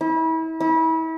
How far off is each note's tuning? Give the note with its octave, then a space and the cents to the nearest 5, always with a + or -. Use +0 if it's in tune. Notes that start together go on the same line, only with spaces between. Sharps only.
E4 -35
E4 -35